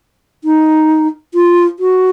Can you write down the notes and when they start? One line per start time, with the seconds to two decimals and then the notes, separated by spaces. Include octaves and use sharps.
0.44 D#4
1.34 F4
1.79 F#4